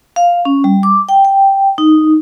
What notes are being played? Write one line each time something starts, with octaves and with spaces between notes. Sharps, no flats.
F5
C#4
G3
D6
G5
G5
D#4